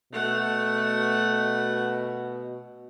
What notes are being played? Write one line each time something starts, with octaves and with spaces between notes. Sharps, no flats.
B2 A3 F#5